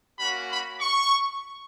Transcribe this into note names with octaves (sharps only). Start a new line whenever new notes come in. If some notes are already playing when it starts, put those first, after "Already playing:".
A#3 C#4 F#4 B5
B5
C#6